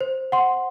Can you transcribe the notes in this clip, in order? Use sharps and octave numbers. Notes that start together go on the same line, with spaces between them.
C5
F#5 C6